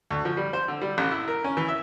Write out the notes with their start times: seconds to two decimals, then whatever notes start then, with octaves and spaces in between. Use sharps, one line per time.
0.11 D2
0.25 F3
0.37 G3
0.53 C5
0.68 D3
0.81 G3
0.98 A1
1.11 E4
1.28 A#4
1.44 C#4
1.57 E3
1.68 E5